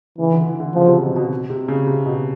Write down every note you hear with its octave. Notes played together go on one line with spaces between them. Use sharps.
C#3 E3
D3
E3
D3
C#3 F3
C3
B2
B2
C3
C#3
C3
B2